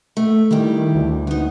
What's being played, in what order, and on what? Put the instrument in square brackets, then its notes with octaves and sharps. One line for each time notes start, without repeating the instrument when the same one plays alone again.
[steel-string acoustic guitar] A3
[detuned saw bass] D#3 [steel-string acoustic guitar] G3 E4 G4
[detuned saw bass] D2
[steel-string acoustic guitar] B3 D#4